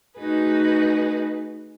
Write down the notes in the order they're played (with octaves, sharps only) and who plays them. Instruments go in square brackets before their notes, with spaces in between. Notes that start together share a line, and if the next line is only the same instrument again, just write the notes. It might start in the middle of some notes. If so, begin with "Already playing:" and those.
[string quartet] A3 D#4 F#4 G#4 B4